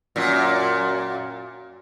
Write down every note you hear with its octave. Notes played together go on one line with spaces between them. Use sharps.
F#2 A#2